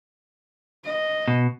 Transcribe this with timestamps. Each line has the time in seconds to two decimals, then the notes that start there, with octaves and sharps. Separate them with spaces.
0.84 D#5
1.28 B2